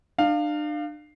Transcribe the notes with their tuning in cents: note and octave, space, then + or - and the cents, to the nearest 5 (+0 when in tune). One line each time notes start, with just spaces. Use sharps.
D4 +35 F5 +0